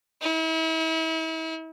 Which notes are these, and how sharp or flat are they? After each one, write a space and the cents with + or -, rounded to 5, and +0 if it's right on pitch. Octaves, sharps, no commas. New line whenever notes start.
E4 -40